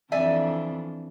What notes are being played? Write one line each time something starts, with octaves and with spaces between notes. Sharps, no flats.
F2 E3 D4 D5 E5 G#5